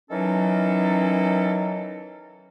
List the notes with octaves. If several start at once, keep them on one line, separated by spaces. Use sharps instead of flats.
D#3 E3 F#3 C#4 D#4 A4